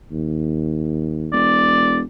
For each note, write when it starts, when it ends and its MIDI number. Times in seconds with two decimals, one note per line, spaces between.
0.11 1.35 39
1.33 2.02 28
1.33 2.00 74